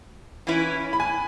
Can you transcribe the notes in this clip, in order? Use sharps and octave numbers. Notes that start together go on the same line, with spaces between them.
E3 C#4 E4 B4
B5
G#5